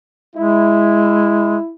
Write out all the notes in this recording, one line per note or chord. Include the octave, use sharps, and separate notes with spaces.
G#3 E4